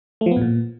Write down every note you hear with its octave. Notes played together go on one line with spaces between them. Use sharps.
A3
F3
B3
A2
A#2